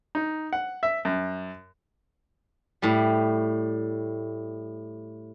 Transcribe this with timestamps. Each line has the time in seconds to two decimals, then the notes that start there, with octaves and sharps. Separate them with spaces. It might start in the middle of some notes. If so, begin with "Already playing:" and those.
0.15 D#4
0.53 F#5
0.83 E5
1.05 F#2
2.82 A2 G3